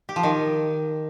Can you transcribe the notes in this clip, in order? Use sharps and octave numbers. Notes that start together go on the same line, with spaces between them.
G4
F3
D#3